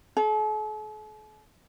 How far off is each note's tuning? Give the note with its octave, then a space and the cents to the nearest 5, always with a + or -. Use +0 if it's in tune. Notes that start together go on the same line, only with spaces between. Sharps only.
A4 -45